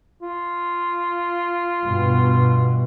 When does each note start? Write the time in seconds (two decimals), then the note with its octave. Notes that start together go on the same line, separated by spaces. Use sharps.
0.22 F4
1.82 G2 B2